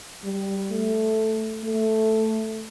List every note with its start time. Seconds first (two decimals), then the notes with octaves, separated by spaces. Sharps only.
0.24 G3
0.71 A3
1.64 A3